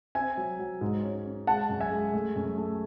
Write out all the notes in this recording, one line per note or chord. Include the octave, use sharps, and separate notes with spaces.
C4 E5 G#5
F#3
F#3
G#2
C#4
C#4
G#3 F#5 A5
F#2
E5 G#5
G#3
A3
F#2
A3